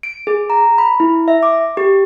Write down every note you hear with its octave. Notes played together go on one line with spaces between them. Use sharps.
D7
G#4
A#5
B5
E4
E5
D6
G4